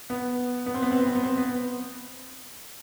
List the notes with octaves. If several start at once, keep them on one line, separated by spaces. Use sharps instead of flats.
B3
B3
C4
B3
C4
B3
C4
B3
C4
B3